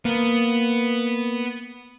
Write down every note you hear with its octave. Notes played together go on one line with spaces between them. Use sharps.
A#3 B3